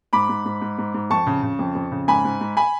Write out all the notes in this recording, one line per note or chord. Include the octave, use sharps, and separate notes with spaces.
G#2 B5 D6
G#2
G#2
G#2
G#2
G#2
F2 A5 C#6
C#3
C#3
F2
F2
C#3
G#2 G#5 B5
G#2
G#2
G#5 B5